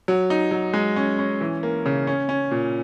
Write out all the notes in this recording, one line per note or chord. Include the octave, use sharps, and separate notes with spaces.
F#3
D#4
F#3
G#3
C#4
C#4
E3
A#3
C#3
C#4
C#4
A#2